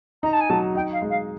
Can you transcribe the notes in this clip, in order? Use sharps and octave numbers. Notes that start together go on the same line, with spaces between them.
D#4 A#5
A5
G#5
F#3 A5
D#4 G5
F5
G#3
F5